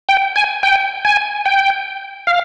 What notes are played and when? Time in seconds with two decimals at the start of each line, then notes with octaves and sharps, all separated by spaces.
0.09 G5
0.36 G#5
0.63 G5
1.05 G#5
1.45 G5
2.27 F5